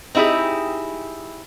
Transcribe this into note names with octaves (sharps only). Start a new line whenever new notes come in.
C4 D#4 E4 G4 G#4